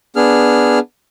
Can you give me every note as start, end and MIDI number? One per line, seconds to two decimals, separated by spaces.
0.16 0.79 59
0.16 0.79 62
0.16 0.79 68
0.16 0.79 89